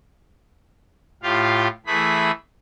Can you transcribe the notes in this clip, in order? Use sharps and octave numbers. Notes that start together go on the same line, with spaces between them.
A2 F4 G4 F5
E3 A3 G#4 B5